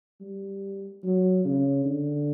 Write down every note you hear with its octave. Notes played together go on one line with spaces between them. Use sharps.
G3
F#3
C#3
D3